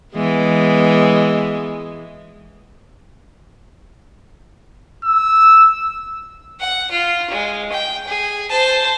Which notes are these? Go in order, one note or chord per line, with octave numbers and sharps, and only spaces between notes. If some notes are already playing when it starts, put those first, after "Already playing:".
E3 G#3 B3
E6
F#5
F4
G#3
G5
G#4
C5 A5